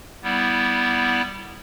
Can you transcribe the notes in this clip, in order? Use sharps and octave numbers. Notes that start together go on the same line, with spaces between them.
G3 B3 E4